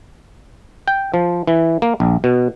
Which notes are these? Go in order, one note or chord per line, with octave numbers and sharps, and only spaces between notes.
G5
F3
E3
A#3
A#1
B2